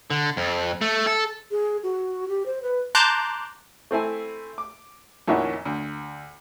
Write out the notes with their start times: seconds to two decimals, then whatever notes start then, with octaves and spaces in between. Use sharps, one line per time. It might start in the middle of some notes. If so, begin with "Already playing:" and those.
0.10 D3
0.37 F2
0.81 A3
1.07 A4
1.51 G#4
1.83 F#4
2.29 G4
2.46 C5
2.62 B4
2.95 A5 A#5 C6 D6 F#6 G6
3.91 A3 C4 E4 G#5
4.58 D6
5.28 F2 A#2 D#3 C#4 E4 F#4
5.65 D2